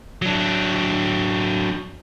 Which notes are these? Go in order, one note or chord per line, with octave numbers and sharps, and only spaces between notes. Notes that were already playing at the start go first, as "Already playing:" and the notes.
F#3 D4